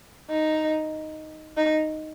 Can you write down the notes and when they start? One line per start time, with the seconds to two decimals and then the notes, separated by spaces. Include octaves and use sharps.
0.29 D#4
1.57 D#4